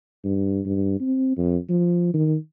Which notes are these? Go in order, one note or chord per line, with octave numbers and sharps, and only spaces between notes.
G2
G2
C4
F2
F3
D#3